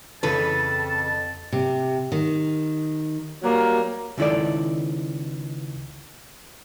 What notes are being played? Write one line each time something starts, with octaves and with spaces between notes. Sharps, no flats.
F2 C#3 E3 A4 B4 A5
C3
D#3
F#3 G3 A#3
C#2 D#3 E4 A4 D5